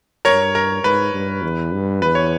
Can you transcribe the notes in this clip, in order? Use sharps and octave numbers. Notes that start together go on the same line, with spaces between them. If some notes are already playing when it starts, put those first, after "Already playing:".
G2 A#4 C#5
A#4
G#2 B4
G2
E2
G2
E2 B4
C#5